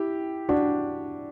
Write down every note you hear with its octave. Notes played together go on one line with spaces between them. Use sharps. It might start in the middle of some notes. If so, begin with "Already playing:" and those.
Already playing: E4 G4
D4 F#4